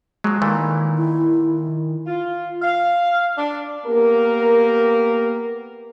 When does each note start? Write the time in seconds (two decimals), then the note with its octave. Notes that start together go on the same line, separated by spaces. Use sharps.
0.24 F3 F#3 G#3
0.42 A#2 D#3 E3 A3
0.98 E4
2.06 F4
2.62 F5
3.37 D4
3.87 A#3 B3 G4 A#4